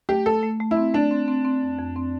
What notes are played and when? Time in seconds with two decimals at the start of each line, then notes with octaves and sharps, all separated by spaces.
0.09 A3 G4
0.26 A3 A4
0.43 A3
0.60 A3
0.71 E4
0.77 C4
0.94 A3 D4
1.11 C4
1.28 C4
1.45 C4
1.63 F2
1.79 F2
1.96 C4